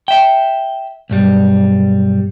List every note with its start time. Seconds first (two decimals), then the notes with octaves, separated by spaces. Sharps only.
0.08 E5 G5
1.10 B1 G2 G3